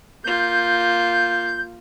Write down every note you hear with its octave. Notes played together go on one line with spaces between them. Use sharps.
A#3 F4 G6